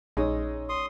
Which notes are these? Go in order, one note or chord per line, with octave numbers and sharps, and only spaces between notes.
A#1 G#3 C#4 D#4 D#6 E6
D5 C6 D#6